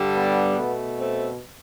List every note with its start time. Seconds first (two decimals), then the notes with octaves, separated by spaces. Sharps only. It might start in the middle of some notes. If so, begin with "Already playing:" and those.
Already playing: G2 D3 G3
0.15 B3
0.57 B2 A3
0.98 A3 C4